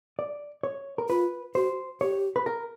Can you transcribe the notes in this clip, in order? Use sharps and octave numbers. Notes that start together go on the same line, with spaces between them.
D5
C#5
A#4
F4 B4
F#4 C5
G4 C#5
B4
A#4